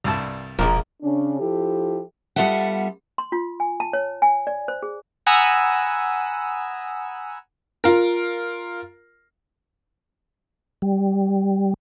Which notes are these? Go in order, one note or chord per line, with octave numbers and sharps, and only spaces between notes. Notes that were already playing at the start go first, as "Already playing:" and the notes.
C2 G2 A5
E1 A#1 G#2 F3 A#3
C#3 C#4 D4
F3 E4 G4 A4
G3 B3 F4 A4 E5 F#5
C6
F4
G#5
A5
C#5
G#5
D5
C5
G#4
F#5 G#5 A#5 B5 D#6 E6
F4 A#4
G3